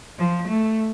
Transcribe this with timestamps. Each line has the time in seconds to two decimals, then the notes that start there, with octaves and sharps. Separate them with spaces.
0.19 F3
0.49 A3